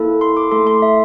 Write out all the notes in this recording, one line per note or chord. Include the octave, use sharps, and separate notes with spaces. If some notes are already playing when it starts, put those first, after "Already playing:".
Already playing: A#3 E4 A4
C6
D6
A3 E4 A4 C6
C6
E5